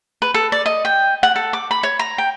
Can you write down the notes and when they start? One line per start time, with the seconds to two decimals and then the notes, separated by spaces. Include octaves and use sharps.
0.22 B4
0.34 A4
0.52 D5
0.66 D#5
0.85 G5
1.23 F#5
1.36 A4
1.53 D6
1.71 B5
1.83 C#5
1.99 A#5
2.18 G5